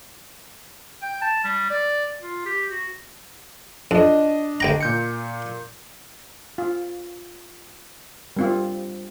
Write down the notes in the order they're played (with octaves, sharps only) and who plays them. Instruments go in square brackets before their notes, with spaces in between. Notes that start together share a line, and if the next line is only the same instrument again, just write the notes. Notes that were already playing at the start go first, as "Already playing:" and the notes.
[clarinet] G5
A5
G3
D5
F4
G4
F#4
[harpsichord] F2 [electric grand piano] D4 D#5
[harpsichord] D2 G5 A#5
[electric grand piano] A#2 G6 C#7
[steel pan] F4
G3 C4 F4